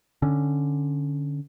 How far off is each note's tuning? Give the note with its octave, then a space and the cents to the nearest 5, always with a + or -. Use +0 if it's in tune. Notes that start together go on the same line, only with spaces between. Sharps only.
D3 +0 C#4 +0